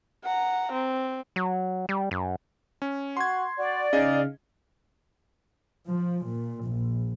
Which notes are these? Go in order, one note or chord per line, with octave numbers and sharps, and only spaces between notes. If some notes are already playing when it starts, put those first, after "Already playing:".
F#5 A#5
C4
F#3
G3
F#2
C#4
F#4 C6 G#6
F#4 D5
C#3 D#4 G#4 D#5 F5
F3
A#2
A#1